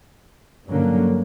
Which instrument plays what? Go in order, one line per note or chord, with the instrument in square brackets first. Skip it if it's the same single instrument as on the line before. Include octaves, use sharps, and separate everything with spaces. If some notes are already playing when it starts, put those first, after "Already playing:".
[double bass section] G2 D3 F#3 A#3 C#4